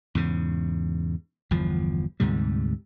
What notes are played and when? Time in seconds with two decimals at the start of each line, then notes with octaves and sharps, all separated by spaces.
0.15 E2 G#2 C#3
1.51 G1 E2 F3
2.20 D2 G#2 C3 G3